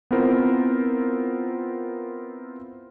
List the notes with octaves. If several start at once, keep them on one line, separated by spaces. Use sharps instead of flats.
B3 C4 E4 F4 A#4 C5